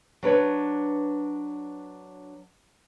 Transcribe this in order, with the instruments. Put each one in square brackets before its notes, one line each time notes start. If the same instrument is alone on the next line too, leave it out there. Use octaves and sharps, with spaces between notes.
[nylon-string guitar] F#3 D4 B4 C#5